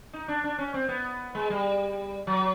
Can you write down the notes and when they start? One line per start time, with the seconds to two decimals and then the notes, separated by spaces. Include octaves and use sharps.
0.13 D#4
0.28 D4
0.44 D4
0.59 C#4
0.74 C4
0.89 B3
1.35 G#3
1.50 G3
2.27 F#3